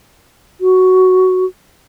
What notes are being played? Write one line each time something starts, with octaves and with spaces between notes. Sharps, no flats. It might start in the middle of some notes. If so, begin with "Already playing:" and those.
F#4